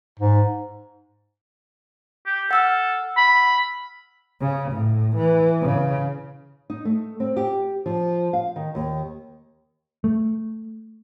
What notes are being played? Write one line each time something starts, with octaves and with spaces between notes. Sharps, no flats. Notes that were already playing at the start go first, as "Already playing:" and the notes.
G#2
G4
A4 F#5 E6 F6
B5
C#3
A2
E3
C#3
D#4
A3
C4
G4
F3
F5
D#3
D#2
A3